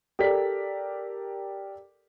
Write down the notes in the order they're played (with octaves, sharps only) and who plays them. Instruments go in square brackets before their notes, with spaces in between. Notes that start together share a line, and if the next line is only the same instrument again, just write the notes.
[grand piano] G4 A4 A#4 D5 B6